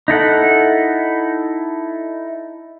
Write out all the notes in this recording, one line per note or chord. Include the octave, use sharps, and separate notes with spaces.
D#4 E4 A4 F#5